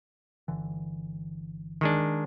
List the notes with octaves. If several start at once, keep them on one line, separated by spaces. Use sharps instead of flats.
G1 D3 E3
D#3 G#3 D4